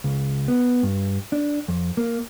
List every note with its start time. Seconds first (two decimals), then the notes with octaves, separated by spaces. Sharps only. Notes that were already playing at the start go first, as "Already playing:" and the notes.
0.04 C#2
0.48 B3
0.83 G2
1.32 D4
1.68 F2
1.97 A#3